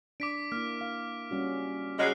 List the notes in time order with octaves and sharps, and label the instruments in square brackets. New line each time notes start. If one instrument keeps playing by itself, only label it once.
[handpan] D4 [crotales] D6 B6 D7
[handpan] A#3 E4 [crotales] F6
[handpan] F5
G3 C#4 F#4
[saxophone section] C#3 F#3 G#3 [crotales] F6 F#6 C7